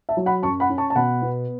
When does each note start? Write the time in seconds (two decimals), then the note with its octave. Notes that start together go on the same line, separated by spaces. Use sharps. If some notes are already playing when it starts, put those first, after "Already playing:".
0.09 E5 A5
0.17 F#3
0.26 F#5 B5
0.43 F#2 A5 C#6
0.60 F#5 B5
0.70 C#4
0.78 A5 C#6
0.90 A5
0.95 B2 F#5 B5
1.22 B3